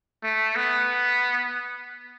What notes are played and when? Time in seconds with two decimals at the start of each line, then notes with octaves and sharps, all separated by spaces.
0.24 A3
0.56 B3